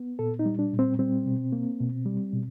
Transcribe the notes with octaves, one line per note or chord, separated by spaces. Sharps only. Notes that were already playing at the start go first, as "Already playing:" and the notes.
Already playing: B3
A#2 A4
D#4
G3
D4
A#2
C4
G3 C4
B2
A#3
B2
G3
B2